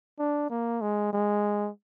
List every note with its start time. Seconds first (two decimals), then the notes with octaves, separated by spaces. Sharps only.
0.19 D4
0.50 A#3
0.81 G#3
1.13 G#3